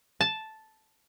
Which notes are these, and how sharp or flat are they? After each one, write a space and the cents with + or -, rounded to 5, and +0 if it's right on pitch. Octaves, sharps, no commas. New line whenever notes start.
A5 -5